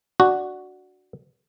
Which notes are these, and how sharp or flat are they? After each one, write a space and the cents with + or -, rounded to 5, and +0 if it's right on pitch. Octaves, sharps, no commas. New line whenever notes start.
D4 +0 F#4 +0